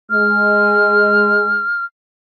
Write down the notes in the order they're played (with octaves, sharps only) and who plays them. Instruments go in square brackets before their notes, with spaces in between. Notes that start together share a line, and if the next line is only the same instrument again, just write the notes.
[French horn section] G#3 [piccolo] F6